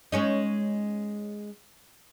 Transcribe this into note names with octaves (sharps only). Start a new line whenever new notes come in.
G#3 C#4 D#4